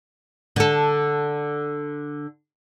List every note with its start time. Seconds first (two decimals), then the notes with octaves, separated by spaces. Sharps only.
0.56 D3 A4